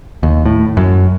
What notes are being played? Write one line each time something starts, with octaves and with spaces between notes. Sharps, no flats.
D#2
A2
F#2